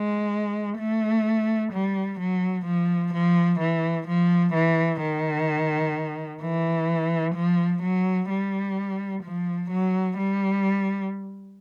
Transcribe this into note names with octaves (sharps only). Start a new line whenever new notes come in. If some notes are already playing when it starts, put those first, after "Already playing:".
Already playing: G#3
A3
G3
F#3
F3
F3
E3
F3
E3
D#3
E3
F3
F#3
G3
F3
F#3
G3